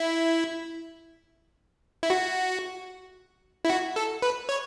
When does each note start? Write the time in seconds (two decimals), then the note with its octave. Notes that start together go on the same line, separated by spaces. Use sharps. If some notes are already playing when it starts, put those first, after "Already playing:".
Already playing: E4
2.03 E4
2.10 F#4
3.65 E4
3.70 F#4
3.96 A4
4.22 B4
4.49 C#5